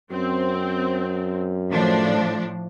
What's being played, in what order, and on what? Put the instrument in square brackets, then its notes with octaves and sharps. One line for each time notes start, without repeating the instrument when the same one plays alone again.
[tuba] F#2 [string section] C4
[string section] A2 F3 D4